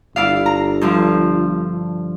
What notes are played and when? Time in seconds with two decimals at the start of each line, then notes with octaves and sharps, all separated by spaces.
0.16 G1 E4 D5 F5
0.46 A#5
0.81 G2 D3 F3